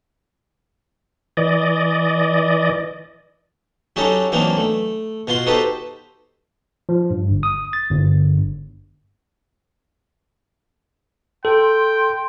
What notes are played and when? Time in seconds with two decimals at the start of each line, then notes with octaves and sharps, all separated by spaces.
1.37 E3 D5 D#5
3.96 F#3 C#4 D#4 F#4 G4 A4
4.32 E3 F#3 A#3 C4 D4 D#4
4.57 A3
5.27 B2 F4 F#4 C6
5.46 D#4 F#4 G4 A4 B4 C5
6.89 F3
7.10 G2
7.31 G1
7.43 D#6
7.73 A6
7.90 G1
11.45 A4 G5 C6